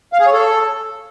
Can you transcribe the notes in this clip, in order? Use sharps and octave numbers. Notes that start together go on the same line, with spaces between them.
F5
G#4
C#5
A4